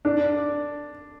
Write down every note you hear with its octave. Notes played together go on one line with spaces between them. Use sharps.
D4